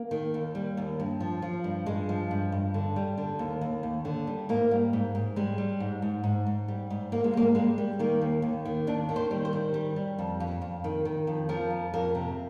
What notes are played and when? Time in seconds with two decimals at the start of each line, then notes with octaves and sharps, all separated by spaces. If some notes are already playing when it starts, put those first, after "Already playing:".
Already playing: A#3
0.11 D#3
0.34 D#2
0.55 G3
0.77 D#2
1.00 G2
1.20 F3
1.42 F3
1.64 G2
1.86 G2 G#3
2.09 F3
2.31 G2
2.52 G2
2.74 D3
2.96 G3
3.18 D3
3.39 D#2
3.61 D#2
3.83 D#2
4.05 D3
4.27 G3
4.49 G#2 A#3
4.71 G3
4.93 G#2
5.15 G#2
5.36 G3 G#3
5.58 G3
5.80 G#2
6.02 G#2
6.24 G#2
6.47 G#2
6.68 G3
6.90 G#2
7.12 G#2 A#3
7.24 G#3
7.34 G3 A#3
7.55 G3 G#3
7.78 G3
7.99 D#3 A#3
8.21 D#2
8.42 D#2
8.65 D#3
8.87 D#2 D4
9.09 D#3
9.16 C5
9.31 G3
9.45 C5
9.53 D#3
9.74 G3
9.96 G3
10.19 F2
10.40 F2
10.62 F2
10.84 D#3
11.05 D#3
11.27 F2
11.49 F3 A#4
11.71 F2
11.94 F2 A#4
12.15 C3